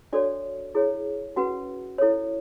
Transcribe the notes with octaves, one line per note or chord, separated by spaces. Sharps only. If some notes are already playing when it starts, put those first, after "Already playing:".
D4 F#4 A4 C#5 D5
E4 G#4 C#5
C#4 F#4 B4 F#5
E4 A4 C#5